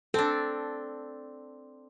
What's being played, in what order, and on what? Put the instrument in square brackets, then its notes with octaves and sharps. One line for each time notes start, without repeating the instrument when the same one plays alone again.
[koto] C4 D4 [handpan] A4